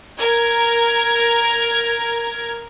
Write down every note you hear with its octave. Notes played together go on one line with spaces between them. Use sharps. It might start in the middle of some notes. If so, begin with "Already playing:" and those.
A#4 G#6